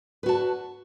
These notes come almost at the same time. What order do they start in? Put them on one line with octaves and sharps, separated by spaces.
B4 F#4 A5